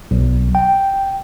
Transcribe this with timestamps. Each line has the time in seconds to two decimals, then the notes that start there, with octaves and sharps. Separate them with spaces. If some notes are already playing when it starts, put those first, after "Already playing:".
0.11 B1
0.55 G5